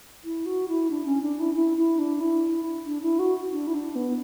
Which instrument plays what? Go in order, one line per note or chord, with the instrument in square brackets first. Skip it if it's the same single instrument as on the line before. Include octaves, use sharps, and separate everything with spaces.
[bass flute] E4
F#4
E4
D4
C#4
D4
E4
E4
E4
D4
E4
D4
E4
F#4
D4
E4
D4
B3